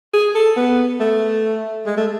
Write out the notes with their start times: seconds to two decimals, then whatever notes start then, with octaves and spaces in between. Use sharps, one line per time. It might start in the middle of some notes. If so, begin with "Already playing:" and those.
0.14 G#4
0.35 A4
0.57 B3
1.00 A3
1.87 G#3
1.97 A3